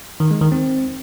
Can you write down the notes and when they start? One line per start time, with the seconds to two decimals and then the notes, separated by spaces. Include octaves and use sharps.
0.20 D#3
0.31 G#3
0.41 D#3
0.52 C4